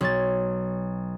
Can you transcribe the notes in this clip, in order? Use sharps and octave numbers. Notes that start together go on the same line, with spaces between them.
B1 C#5 A6